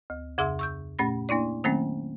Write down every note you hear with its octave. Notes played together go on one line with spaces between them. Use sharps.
D2
F2 C#3 G#4 E5 C6 E6
C#6 E6 G6
A#2 A3 C#4 B5 A#6
A#3 D4 E4 D5
D#3 F#3 A3 A#3 C4 C#4